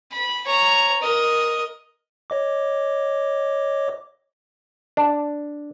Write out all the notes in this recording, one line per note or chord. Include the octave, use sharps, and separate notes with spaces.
B5
C#5 A#5
A#4 D#5
C#5 D#5 D6
D4